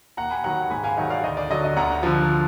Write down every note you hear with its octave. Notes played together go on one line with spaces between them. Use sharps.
D#2 F#5 A#5
G#5 B5
D#3 F#3 F#5 A#5
G#2 G#5 B5
F5 G#5
D#3 F#3 D#5 F#5
D5 F5
D2 D#5
D5
D3 F#3 D#5
D#5
D2 F#5 A#5
D3 F3